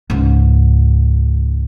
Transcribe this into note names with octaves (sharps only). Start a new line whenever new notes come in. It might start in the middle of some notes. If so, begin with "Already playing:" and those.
C#2 G#2